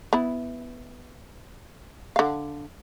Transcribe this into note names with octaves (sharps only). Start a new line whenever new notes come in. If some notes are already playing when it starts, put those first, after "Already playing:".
B3 E4 B5
D3 F5